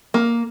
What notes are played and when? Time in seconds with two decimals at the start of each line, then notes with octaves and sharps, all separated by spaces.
0.14 A#3